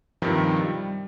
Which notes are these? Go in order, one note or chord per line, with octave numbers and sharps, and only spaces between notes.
G2 C3 D#3 F3
G3